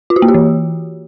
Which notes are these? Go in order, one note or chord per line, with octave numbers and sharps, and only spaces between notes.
F4
F#4
A#3
G4
E3